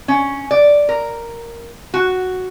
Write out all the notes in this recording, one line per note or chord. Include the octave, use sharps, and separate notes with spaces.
C#4
D5
A#4
F#4